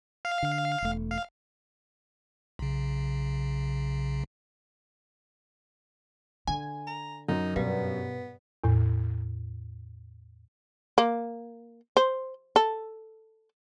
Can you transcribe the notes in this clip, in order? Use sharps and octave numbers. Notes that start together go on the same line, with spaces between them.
F5
D3
E1 A3
F5
B1 C#3
D3 G#5
A#5
F#2 D#4
G2 B2 B3
E2 A2
A#3
C5
A4